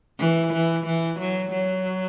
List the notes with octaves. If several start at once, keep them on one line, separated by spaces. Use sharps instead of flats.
E3
E3
E3
F#3
F#3